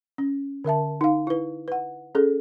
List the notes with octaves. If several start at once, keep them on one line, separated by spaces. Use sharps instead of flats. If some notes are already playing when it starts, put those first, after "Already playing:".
C#4
D3 A#4 E5 A5
D#4 F5
E4 B4
B4 F#5
C#4 G#4 A4